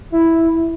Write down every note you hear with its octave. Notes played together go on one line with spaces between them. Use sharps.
E4